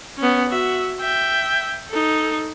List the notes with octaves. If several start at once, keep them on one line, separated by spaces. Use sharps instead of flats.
B3 C#4
F#4 E5
E5 G5
D#4 A4